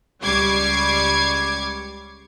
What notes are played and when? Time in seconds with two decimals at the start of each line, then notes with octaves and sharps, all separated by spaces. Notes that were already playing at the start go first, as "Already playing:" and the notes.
0.22 C#2 G3 C#6 D6 G#6 C7